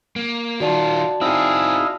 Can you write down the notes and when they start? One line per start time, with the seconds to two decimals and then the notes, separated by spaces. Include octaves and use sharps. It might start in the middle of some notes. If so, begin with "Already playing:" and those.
0.16 A#3
0.60 D#3 F4 F#4 D5 A5
1.21 C4 D#4 E4 G#4 F5